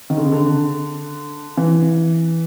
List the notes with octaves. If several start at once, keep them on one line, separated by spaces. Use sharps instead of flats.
D#3
D3
C#3
D3
E3